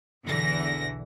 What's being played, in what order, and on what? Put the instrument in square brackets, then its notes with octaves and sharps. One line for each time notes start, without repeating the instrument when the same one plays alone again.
[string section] B1 E2 D3 E3 A#6